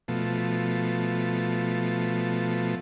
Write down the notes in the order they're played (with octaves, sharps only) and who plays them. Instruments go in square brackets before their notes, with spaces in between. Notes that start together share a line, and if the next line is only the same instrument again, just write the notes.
[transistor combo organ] B2 F3 A3